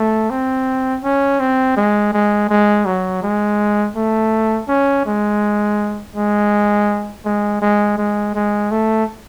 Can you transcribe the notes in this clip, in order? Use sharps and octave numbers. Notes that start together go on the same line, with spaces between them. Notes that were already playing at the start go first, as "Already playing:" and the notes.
Already playing: A3
C4
C#4
C4
G#3
G#3
G#3
F#3
G#3
A3
C#4
G#3
G#3
G#3
G#3
G#3
G#3
A3